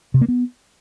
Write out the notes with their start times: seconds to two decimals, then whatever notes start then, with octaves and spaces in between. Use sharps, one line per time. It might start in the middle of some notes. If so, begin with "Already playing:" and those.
0.14 C3
0.21 A#3
0.28 B3